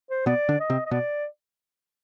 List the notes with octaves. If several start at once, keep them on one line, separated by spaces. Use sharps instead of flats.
C5
B2 B3 D5
D3 D4
D#5
C3 C4
D#5
B2 B3 D5